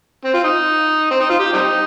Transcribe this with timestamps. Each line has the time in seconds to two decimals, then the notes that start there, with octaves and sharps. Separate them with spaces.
0.25 C4
0.34 F4
0.44 D#4
1.11 C4
1.20 D#4
1.29 F4
1.39 G4
1.53 G3 C4 D#4